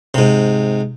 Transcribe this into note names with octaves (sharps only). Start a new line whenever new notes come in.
G#2 C3